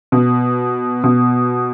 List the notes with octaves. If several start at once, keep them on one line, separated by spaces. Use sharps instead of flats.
B2
B2